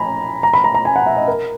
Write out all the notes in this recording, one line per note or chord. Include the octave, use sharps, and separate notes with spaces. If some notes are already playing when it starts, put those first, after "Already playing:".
Already playing: G#5 A#5 B5
A#5
B5
A#5
A#5
G#5
F#5
E5
D#5
A#4